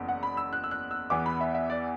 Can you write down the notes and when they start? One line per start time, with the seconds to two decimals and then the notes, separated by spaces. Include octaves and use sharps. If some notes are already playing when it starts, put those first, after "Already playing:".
Already playing: F#1 E2
0.09 F#5
0.23 B5
0.37 E6
0.53 F#6
0.64 E6
0.71 F#6
0.91 E6
1.10 E2 E3 B3 D6
1.26 B5
1.41 E5
1.55 E5
1.70 D5